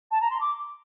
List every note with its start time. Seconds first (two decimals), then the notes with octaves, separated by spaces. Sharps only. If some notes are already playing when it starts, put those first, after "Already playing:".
0.11 A5
0.21 A#5
0.31 C6
0.40 D6